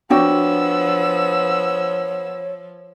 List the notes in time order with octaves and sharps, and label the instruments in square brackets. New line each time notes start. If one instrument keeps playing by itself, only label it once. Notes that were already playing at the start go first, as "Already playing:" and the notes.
[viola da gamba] F3 [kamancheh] B3 E6 [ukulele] D4 F#4 G5 [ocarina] C#5